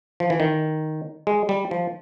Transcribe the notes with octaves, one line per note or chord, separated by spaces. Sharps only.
F3
E3
D#3
G#3
G3
F3